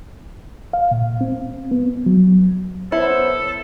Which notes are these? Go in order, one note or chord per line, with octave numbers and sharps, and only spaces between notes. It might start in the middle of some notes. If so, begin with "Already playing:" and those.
F5
A#2
C4
B3
F#3
B3 E4 A4 C5 C#5